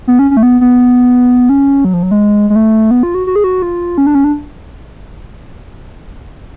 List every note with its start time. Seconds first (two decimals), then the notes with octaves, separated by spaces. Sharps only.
0.07 B3
0.19 C#4
0.31 C#4
0.37 A3
0.43 B3
0.61 B3
1.49 C#4
1.85 F#3
1.94 F3
2.03 F#3
2.11 G#3
2.50 G#3
2.56 A3
2.91 B3
3.03 F4
3.15 F#4
3.27 F#4
3.36 G#4
3.44 F#4
3.62 F4
3.98 C#4
4.06 D4
4.15 C#4
4.24 D4